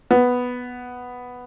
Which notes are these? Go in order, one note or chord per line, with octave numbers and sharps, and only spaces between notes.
B3